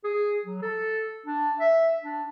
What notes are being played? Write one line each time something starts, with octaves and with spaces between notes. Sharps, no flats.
G#4
F#3
A4
D4
E5
D4